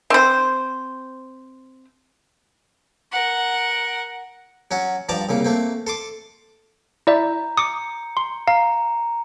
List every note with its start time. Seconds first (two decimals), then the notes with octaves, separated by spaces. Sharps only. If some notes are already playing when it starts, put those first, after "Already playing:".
0.10 C4 C5
3.12 A#4 F#5
4.71 F#3 C#4 F#4
5.09 G2 F3 D5 A5 A#5
5.29 C2 C#3 A#3
5.45 A3 A#3 C4
5.87 A4 C6 D6
7.07 E4 D5 E5 A#5 G6
7.57 D6 D#6 C#7
8.17 C6
8.47 F5 A#5